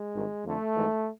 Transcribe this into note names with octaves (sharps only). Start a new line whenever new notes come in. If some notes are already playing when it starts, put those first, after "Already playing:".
Already playing: G#3
G#1 G2 D#3
F2 D3 A3
G#1 G#2 E3